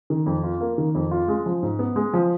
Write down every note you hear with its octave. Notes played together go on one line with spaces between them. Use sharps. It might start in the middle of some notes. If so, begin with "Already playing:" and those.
D#3
F2
F4
A#3
D#3
F2
F4
G#3
F3
G#2
B3
G#3
F3